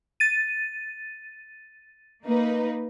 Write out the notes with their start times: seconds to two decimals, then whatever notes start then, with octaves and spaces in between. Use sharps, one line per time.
0.20 A6 D#7
2.25 A#3 D#4 B4